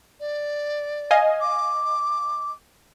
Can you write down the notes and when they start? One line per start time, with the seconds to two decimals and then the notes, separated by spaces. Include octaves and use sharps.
0.19 D5
1.11 D#5 F5 G#5
1.40 D6